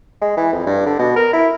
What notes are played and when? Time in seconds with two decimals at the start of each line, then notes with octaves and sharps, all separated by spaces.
0.21 G#3
0.37 E3
0.53 F2
0.66 G2
0.87 D3
0.99 B2
1.16 A#4
1.33 E4